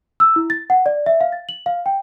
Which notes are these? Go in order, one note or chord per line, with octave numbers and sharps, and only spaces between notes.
E6
E4
A6
F#5
D5
E5
F5
A6
F#7
F5
G5